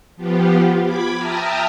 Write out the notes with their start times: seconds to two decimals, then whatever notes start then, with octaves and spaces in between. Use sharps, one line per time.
0.16 F3 B3 F4 G4
0.82 B5 D6 G#6 B6
1.15 E5 G5 A5 A#5 D#6 F6